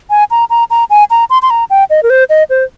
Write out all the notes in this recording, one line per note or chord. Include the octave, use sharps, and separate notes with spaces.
G#5
A#5
A#5
A#5
G#5
A#5
C6
C6
A#5
G5
D#5
A#4
C5
D#5
C5